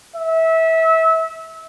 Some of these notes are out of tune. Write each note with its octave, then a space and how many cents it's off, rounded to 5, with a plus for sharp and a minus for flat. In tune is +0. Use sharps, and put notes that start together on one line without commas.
E5 -25